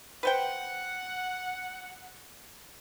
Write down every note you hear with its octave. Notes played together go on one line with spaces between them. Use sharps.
B4 C5 F#5 G5